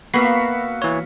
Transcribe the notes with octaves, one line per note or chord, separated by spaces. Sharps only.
A#3 B3 F#4 E5 F5 B5 C7
E3 C#5